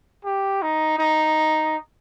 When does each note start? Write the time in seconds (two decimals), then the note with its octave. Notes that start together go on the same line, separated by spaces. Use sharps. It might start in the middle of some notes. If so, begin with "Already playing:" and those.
0.24 G4
0.62 D#4
0.98 D#4